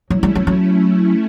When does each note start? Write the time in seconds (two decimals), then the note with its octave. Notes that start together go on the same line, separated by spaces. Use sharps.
0.10 F#3 A3 C#4 E4
0.23 G3
0.35 F#3
0.47 F#3